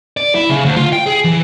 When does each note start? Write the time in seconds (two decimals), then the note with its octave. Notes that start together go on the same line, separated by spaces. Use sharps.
0.17 D5
0.35 E4
0.50 C#3
0.65 D2
0.76 F4
0.93 G5
1.06 G#4
1.25 E3